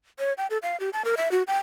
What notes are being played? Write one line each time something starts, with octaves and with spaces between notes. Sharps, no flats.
C#5
G5
A4
F5
G4
A5
A#4
E5
F#4
G5